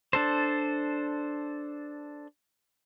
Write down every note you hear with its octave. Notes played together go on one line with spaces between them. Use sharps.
D4 A4 C5